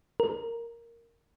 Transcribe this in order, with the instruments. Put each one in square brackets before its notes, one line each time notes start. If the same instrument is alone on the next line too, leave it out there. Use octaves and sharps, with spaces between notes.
[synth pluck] A#4